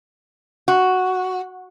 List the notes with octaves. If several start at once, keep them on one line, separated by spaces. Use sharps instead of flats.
F#4